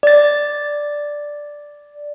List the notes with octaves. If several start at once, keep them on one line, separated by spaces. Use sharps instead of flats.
D5 A6